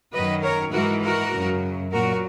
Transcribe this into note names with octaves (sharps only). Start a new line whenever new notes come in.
F#2 D#3 F#3 B4 D#5
A#4 C#5
G#2 E3 G#3 F#4 A#4
F#4 A#4
F#2 C#3 F#3
A#2 F#3 F#4 A#4